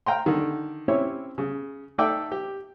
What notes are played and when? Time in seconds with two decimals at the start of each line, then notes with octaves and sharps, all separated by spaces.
0.06 F5 G5 A#5 C6
0.26 D3 D#3
0.88 C4 C#4 E4 G4 C#5
1.38 C#3
1.98 A3 D#4 A4 D5 E5 G5
2.32 G4